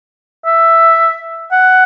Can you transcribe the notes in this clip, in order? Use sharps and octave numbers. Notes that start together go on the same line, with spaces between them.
E5
F#5